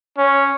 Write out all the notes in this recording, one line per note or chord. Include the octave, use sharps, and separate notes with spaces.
C#4